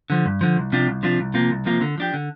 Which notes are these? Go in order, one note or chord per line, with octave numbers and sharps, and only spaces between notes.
D3 F3
G2
D3 F3
C2
C3 F3 D4 F4
C2
C3 F3 D4 F4
C2
C3 F3 A#3 F4
C2
C3 F3 A#3 F4
D3
F3 D4 G4
D3